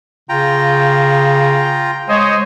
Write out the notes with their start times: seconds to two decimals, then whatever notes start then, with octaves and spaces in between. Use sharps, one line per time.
0.29 C#3 F4 G5 A#5
2.09 G#3 C5 C#5 D#5 G#5